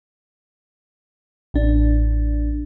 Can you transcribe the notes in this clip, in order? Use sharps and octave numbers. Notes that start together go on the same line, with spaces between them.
A1 D4